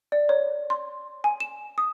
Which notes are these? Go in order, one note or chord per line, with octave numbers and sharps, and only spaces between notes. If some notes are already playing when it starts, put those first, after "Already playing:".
D5
C#5
C6
G#5
E7
D#6